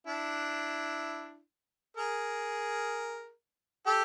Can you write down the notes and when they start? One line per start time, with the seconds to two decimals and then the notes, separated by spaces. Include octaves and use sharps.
0.07 D4 E4
1.97 G#4 A#4
3.86 G4 A4